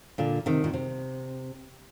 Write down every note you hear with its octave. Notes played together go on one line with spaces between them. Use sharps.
A#2 D3
C3 D#3
A#2
C3